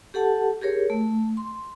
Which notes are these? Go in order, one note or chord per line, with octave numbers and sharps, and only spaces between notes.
G4 A4 F#5 A5
G4 G#4 A#4 C#5
A3
C6